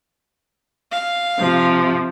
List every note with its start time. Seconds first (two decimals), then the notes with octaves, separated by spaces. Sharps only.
0.92 F5
1.39 C3 F3